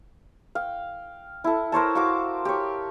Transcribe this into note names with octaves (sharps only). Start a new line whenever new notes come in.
F5 G5
E4 A4
A#4 C5 C#5 A5
F#4 F5 D6
G4 C#5